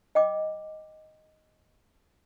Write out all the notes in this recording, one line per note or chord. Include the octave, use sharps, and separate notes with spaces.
D#5 G5 D6